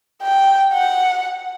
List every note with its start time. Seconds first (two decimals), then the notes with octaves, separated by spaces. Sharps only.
0.23 G5
0.74 F#5